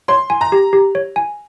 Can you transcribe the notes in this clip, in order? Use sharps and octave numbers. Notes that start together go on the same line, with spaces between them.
C#5 C6
G#5
A#5
G4
G4
C#5
G#5